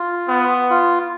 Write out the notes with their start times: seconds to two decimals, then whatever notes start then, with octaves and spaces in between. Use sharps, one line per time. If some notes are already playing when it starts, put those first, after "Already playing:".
Already playing: F4
0.28 B3
0.70 F4